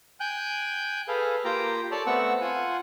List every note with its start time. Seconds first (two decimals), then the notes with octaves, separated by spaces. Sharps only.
0.20 G5 G#5 F#6 G6
1.08 G#4 A4 B4 F5
1.45 A#3 F4 G4 G5 A#5
1.91 A4 C#5 D5 A5
2.07 A3 B3 C4 F#5 C#6 E6
2.41 F4 F#5 G#5